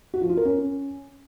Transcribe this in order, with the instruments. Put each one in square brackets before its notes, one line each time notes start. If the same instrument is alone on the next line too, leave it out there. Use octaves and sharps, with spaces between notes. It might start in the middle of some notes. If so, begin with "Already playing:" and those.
[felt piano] F#4
F3
F4
A#4
C#4